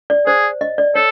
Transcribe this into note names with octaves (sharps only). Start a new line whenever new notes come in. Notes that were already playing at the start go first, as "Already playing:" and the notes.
D5
G#4 C5
D#5
D5
A4 C#5